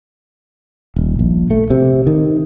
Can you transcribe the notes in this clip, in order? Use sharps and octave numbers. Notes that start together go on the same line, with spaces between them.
D#1
A#1
A3
C3
D#3